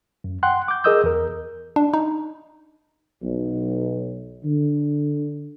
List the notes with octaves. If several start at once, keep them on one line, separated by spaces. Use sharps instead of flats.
F#2
F#5 G5 C6 F#6
D6 G6
G#4 A#4 D#5 D#6 E6 G6
E2 A#4
D4
D#4
B1
D3